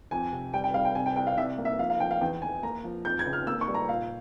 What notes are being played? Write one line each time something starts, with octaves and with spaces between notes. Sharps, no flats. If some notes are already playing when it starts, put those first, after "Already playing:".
F2 G#5
C3
G3 G5
G5
G3 F5
G5
C3 G#5
G5
C2 G5
F5
C2 E5
A#3
E5
F3 F5
F5
F3 G5
F5
E2 G5
E2 G#5
A#3 A#5
F3
F2 G6
G#6
C#3
F6
A#3 E6
C#6
G3
A#5
A#2 F5